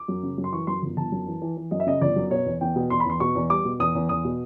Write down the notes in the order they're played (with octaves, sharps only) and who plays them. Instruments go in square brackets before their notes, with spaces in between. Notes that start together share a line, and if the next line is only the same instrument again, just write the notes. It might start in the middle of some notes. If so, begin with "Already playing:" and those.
Already playing: [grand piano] D6
F#2
C#3
F#2
C6
E3 C#6
F#2 C6
G1
G1 A5
F#2
E3
E3
E3
F#2 D#5
E5
C#3 D#5
G1 D5
F#2
B2 C#5
E2
E2 G5
B2
E2 C6
B5
E2 C6
B2 C#6
E2
G3 D6
B2
E2 D#6
E2
E2 D#6
B2